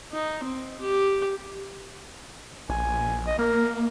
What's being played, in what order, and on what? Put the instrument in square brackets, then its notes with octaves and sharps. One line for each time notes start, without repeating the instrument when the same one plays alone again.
[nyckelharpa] D#4
C4
G4
[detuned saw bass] A#1 [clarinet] G#5
[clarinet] D#5
[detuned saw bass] A#3 [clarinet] A#4